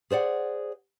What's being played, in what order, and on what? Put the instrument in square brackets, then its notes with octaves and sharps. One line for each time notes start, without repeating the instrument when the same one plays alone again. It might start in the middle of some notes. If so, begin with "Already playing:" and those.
[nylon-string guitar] G#4 C5 D5 F#5